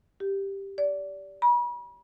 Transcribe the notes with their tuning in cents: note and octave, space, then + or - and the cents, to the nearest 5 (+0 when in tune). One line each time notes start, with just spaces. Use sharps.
G4 +5
D5 -25
B5 -40